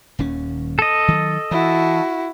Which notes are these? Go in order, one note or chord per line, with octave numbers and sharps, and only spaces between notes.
D#1 D#2 C#4
A4 D#5
D#3 F#3
E3 E4 F#4